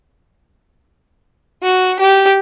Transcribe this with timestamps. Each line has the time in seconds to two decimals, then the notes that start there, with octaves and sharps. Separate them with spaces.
1.62 F#4
1.99 G4